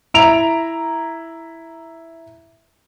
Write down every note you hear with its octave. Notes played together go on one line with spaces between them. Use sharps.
E4 A#5 D7 F7